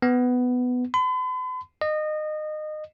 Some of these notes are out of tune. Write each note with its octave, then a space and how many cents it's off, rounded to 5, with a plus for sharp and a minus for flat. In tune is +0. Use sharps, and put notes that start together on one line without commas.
B3 +10
B5 +45
D#5 -25